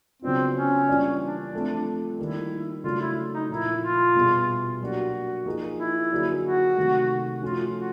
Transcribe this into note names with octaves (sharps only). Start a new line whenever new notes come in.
C#3 F#3 B3 C4 D4 F4
C#4
E3 G3 A#3 D4 F4
D4
F3 A3 C4
D#3 G3 A#3 E4
C#3 F#3 A3 D4 F4
E4
D#4
A#2 F3 A#3 E4
F4
B2 G3 B3 E4 G#4
F#3 A#3 D4 F#4 G4
F3 A#3 D#4 G#4
E4
D3 F#3 A#3 D#4 G#4
F#4
C3 D#3 F#3 A3
F3 A3 C#4 F4 F#4
F#4